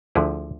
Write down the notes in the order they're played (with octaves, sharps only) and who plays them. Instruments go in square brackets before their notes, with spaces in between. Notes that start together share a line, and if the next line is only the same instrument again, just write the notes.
[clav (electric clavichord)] D2 D3 F3 E4 G#4